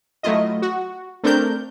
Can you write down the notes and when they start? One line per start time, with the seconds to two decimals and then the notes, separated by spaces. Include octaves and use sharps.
0.23 F#3 A3 E4 F4 D#5
0.62 F#4
1.23 A3 C4 D4 A#4 G6